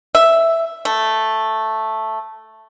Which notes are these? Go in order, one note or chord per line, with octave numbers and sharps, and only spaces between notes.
E5
A3